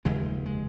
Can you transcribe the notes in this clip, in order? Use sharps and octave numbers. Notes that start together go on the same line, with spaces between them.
F1 D#2 C#3 G#3
G#3